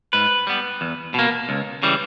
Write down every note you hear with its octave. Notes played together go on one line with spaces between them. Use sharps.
G#2 B4
G3 B3
E2
B2 A#3
C#2
C#3 E3 G3